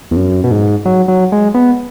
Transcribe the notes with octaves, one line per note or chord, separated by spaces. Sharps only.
E2
F#2
B2
G#2
F#3
F#3
G#3
B3